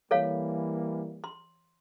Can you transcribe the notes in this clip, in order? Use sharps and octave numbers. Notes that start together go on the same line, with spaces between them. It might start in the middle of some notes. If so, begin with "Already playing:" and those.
E3 G3 A#3 A4 C#5 F5
C6